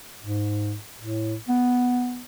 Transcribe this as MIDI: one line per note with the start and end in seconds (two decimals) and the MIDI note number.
0.22 0.76 44
0.99 1.35 45
1.49 2.25 59